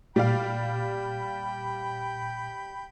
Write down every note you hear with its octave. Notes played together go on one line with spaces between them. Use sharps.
A#2 G3 D5 F5 G5 B5